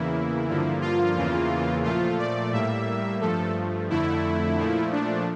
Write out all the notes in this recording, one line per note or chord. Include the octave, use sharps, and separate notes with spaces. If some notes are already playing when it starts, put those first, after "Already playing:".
Already playing: E2 C#3 E3 A#3 E4
G2 D3 F3 A#3
F4
E2 C#3 E3 A#3
A#2 F3 A3 F4
D5
A2 G3 A#3 E5
G2 F3 A3 A4
F2 D3 A3 E4
A#2 F3 A3
D4